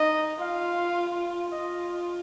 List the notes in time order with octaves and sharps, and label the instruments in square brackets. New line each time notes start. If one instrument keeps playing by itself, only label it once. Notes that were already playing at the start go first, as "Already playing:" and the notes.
Already playing: [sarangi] D#4 [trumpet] D#5
[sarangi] F4 [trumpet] F5
[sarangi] F4 [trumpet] D#5